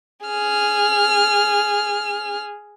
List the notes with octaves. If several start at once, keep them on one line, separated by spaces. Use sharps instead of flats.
G#4 F6